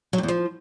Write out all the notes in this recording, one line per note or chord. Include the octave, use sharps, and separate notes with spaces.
F#3
G2
E2
F3